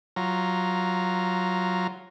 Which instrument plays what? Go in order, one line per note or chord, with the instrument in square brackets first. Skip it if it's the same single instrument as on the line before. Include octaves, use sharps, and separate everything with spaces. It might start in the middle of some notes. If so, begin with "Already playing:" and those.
[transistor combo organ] F#3 F4 A#5